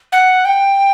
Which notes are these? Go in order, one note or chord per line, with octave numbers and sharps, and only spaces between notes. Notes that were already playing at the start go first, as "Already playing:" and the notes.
F#5
G5